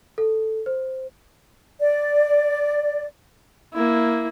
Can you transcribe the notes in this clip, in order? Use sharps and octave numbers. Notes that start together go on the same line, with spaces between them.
A4
C5
D5
A#3 E4